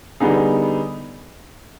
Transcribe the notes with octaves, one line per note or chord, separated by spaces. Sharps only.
D3 G3 B3 D#4 G#4